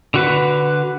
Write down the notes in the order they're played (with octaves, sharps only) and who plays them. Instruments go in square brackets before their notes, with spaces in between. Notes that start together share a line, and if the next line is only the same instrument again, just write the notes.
[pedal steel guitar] D3 F#4 B4